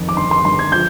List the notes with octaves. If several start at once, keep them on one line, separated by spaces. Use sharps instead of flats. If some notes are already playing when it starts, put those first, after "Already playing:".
Already playing: F2 D#3
D6
G1 C6
C6
G1 C6
G#6
F3 G6